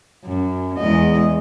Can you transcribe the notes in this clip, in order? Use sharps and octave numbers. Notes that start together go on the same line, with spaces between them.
F#2
E2 G#3 D#5